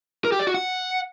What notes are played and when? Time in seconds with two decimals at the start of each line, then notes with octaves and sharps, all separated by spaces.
0.25 A#4
0.32 G4
0.40 D5
0.47 F#4
0.54 F#5